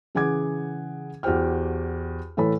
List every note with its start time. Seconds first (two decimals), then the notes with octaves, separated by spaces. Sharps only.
0.15 C#3 E3 G#4 F#5 D6 G#6
1.23 E2 F#4 G4 C5 G5 F6
2.37 A2 E3 A4 C#5 B5